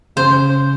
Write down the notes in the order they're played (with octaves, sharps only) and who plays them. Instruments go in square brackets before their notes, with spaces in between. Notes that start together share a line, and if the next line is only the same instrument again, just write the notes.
[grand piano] C#3 [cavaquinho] C5